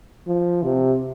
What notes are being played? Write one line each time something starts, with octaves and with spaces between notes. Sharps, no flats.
F3
C3